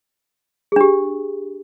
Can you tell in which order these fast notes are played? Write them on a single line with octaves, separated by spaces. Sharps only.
G#4 D4 G4